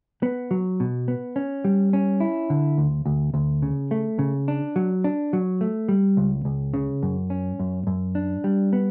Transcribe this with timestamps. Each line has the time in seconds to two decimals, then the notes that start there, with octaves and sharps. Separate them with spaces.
0.23 B3
0.51 F#3
0.80 B2
1.08 B3
1.36 C#4
1.65 G3
1.93 C#4
2.20 E4
2.50 D3
2.78 D2
3.06 D2
3.34 D2
3.62 C#3
3.91 A3
4.19 C#3
4.48 D4
4.76 F#3
5.04 D4
5.33 F#3
5.61 A3
5.89 G3
6.17 C#2
6.45 C#2
6.74 C#3
7.03 F#2
7.30 C#4
7.59 F#2
7.87 F#2
8.15 D4
8.44 G3
8.73 B3